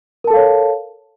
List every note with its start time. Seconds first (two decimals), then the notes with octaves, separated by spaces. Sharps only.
0.24 A#4
0.27 A5
0.30 A4
0.34 F5
0.37 C#5